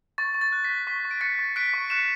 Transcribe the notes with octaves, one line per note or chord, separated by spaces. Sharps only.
C#6 A6
C#6
A6
F#6
B6
F#6
C#6 B6
C#6
D7
F#6 A6 C#7
C#6
F#6 B6 D7
C#6
F#6 C#7 E7